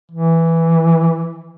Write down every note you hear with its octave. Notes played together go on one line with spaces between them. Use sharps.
E3